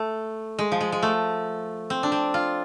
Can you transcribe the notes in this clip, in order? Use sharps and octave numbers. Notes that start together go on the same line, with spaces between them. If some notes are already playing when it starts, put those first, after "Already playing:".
Already playing: A3
G#3
F3
G#3
G#3
A3
C4
D4
C4
F4